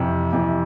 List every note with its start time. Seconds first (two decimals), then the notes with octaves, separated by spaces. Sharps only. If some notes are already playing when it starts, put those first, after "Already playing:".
Already playing: F2 C3 E3
0.33 F2 C3 E3